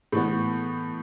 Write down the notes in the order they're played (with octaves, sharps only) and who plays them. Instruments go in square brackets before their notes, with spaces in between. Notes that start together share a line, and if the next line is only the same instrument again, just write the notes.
[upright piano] A2 E3 B3